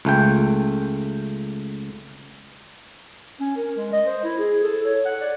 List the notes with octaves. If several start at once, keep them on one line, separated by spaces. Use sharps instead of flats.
C#2 A3 G5
C#4
A#4
G#3
D#5
C5
E4
G#4
A4
C#5
F#5
D5